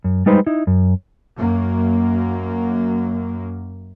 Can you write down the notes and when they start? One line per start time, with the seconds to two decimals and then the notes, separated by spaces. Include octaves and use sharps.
0.04 F#2
0.26 G3 G#3 D#4 B4 C5
0.46 D#4 E4
0.67 F#2
1.37 F#2 A#3